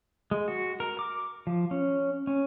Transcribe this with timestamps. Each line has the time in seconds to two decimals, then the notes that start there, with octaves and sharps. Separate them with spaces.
0.31 G#3
0.48 F#4
0.80 A#4
0.99 D6
1.47 F3
1.71 C#4
2.27 C#4